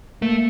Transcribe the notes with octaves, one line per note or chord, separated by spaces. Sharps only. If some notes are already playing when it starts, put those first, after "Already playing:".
A3 A#3